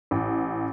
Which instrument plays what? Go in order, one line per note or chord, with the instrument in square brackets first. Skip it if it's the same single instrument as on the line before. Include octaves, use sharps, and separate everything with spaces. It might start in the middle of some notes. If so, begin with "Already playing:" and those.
[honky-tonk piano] A1